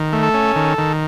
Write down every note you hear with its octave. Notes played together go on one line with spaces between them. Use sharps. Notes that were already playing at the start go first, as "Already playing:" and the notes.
Already playing: D#3
A3
A4
C#4
D#3
D#3